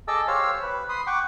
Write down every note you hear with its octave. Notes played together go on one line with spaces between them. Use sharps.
G#4 A4 D#5 A5 D6 E6
G4 C5 C#5 F5 E6
B4
B5 C6 D#6
F#5 G5 C#6 D6